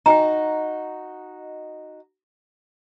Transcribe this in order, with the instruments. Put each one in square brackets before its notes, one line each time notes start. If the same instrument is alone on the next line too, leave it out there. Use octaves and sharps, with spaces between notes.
[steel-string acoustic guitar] D#4 F#4 D#5 [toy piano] G5 G#5 A#5